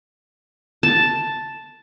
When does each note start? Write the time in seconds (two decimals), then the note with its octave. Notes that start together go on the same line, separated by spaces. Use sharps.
0.83 A5